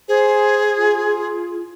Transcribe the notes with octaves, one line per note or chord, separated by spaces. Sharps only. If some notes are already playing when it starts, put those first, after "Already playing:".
G#4 C5
F4